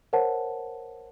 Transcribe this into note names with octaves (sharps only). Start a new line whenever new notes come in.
A#4 C5 C#5 F#5 A5